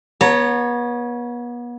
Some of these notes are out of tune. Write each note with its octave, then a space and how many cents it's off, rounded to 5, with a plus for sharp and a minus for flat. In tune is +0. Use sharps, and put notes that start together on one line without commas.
B3 -35 C#5 +0 A#5 -40